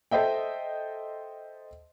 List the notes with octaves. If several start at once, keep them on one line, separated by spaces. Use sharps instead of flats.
A4 C5 D#5 E5 G5